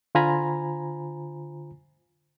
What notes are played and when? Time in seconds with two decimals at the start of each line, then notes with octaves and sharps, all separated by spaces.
0.15 D3 F4 C5 G#5 A#5 B5